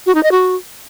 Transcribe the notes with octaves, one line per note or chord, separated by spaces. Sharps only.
F#4
D#4
D#5
F#4